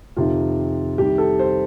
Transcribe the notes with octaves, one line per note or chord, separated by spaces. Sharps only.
F2 C3 D#3 F4
C2 C3 D#3 G4
A4
C5